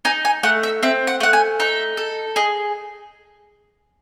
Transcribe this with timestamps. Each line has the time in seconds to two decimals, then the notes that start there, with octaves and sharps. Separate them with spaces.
0.05 D#4 G#5
0.25 G#5
0.43 A3 F#5
0.63 E5
0.83 C4 E5
1.07 F#5
1.20 A3 F#5
1.33 G#5
1.60 D#4 E5
1.97 A4
2.36 G#4 D#5